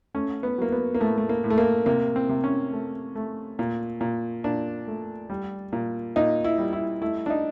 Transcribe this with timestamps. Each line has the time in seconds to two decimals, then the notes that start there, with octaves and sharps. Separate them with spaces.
0.14 A3 C#4
0.43 B3
0.58 F#3 A#3
0.72 B3
0.95 A#3
1.00 A2 A3
1.18 A3
1.29 A#3
1.44 A2
1.50 A3
1.58 A#3
1.86 C3 A#3
2.16 C4
2.29 C3
2.44 C#4
2.72 A3
3.16 A3
3.59 A#2
4.01 A#2
4.44 A#2 D4
4.87 A3
5.30 G3
5.72 A#2
6.16 A#2 D#4
6.44 E4
6.58 G3
6.73 E4
7.01 A3 E4
7.26 D4
7.30 D#4